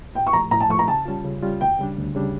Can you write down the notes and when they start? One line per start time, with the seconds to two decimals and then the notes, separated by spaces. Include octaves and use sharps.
0.15 A2 G5
0.27 C#6
0.33 F3 A#5
0.37 A3
0.51 A2 A#5
0.60 A5
0.69 F3 A3 C#6
0.79 A#5
0.88 C#3 A5
1.06 G3 C#4 F4
1.25 C#3
1.42 G3 C#4 F4
1.61 D2 G5
1.79 C#3 G3 D4
1.97 D2
2.15 C#3 G3 D4